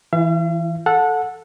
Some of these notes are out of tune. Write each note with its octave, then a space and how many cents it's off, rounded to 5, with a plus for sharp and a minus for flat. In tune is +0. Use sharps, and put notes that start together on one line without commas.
E3 +0 E4 +45 F5 -45
A4 +0 F#5 -25